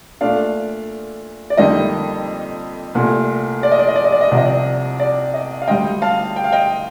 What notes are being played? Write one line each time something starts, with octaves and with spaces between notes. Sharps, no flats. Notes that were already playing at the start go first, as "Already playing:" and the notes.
A#2 A3 D4 D5 F5
D5
F2 D3 G3 A#3 D#4 D#5
C2 A#2 A3
D5
D#5
D5
D#5
D5
D#5
D5
D#5
C2 C3 F3 D5
D#5
D5
D5
D#5
F5
D2 D3 G3 D#5 G5
F5 A5
G5
F5
D#5 G5